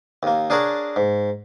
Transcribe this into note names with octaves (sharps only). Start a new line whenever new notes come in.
D#2 A#3
D4 G#4 A#4 C#5 F#5 A5
G#2